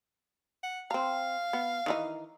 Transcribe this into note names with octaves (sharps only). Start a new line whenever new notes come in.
F#5
C4 F5 A#5
B3
D#3 E3 D#4